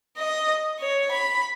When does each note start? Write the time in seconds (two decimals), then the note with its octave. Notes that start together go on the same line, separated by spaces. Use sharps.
0.17 D#5
0.80 C#5
1.11 B5